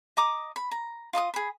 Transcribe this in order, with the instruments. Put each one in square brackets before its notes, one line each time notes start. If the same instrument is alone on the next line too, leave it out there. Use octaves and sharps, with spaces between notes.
[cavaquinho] D#5 A#5 D6 D#6
B5
A#5
F4 D#5 A#5 D#6
G#4 B5